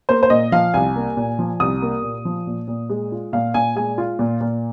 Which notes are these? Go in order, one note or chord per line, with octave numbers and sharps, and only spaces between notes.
A#3 C5
C5
A#2 D#5
F3 F5
C2 G#5
A#3
A#2
F3
C2 D#6
A#3
A#2
F3
A#2
A#2
G#3
F4
A#2 F5
A#2 G#5
G#3 G#5
F4
A#2
A#2